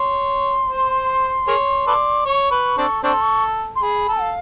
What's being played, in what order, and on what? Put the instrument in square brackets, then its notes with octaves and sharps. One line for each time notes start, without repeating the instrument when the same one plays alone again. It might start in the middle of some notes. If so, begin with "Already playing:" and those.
Already playing: [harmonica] C#5 [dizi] C6
[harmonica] C5
G#4 A#4 C#5
A4 B4 D5
[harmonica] C#5 [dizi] C#6
[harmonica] B4
C4 D4 A4
[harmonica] C4 D4 A4 [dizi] C#6
[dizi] C6
C#6
C6
[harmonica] G#4 [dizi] B5
[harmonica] A4
[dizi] F5